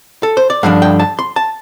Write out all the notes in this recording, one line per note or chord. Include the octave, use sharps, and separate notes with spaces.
A4
C5
D5
G2 D3 F3 D4 F5
G5
A5
C6
A5